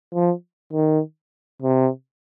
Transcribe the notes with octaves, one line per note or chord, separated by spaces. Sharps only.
F3
D#3
C3